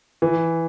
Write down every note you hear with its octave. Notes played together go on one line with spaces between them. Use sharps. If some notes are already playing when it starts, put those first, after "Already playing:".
E3